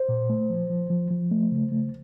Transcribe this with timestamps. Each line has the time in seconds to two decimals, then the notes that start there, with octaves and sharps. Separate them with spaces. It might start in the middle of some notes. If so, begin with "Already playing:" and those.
Already playing: C5
0.09 A#2
0.30 A3
0.50 F3
0.70 F3
0.90 F3
1.11 F3
1.31 A3
1.51 C#3
1.72 A3